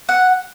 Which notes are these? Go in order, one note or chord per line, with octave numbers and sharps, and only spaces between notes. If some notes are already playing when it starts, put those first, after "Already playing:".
F#5